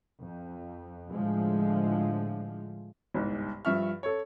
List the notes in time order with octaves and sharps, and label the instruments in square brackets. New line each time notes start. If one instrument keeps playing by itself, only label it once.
[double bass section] F2
A2 D3 F3 G#3
[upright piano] G1 C2 G#2
G2 F3 E5 C#6 F6
A4 C#5